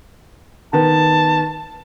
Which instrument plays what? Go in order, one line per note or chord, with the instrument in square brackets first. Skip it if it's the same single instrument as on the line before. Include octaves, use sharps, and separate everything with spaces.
[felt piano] D#3 B3 [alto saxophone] A5